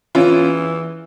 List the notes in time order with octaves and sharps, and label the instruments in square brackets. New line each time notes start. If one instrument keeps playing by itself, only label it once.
[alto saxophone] E3 [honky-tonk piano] C#4 F4